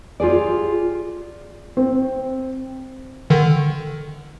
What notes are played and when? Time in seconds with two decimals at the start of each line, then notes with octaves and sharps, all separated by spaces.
0.20 F4 G4 G#4 D5
1.77 C4
3.30 D3 D#3